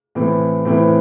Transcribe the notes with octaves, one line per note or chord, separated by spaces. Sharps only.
A2 E3 C4
A2 E3 C4